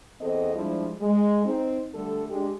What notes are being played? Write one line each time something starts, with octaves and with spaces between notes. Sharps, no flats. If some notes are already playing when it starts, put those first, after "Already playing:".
E2 C4 A4 D#5
F3 G3 G#3 D4 E4
G#3
C4 D#4
D3 G3 A3 A4
G#3 D4 G4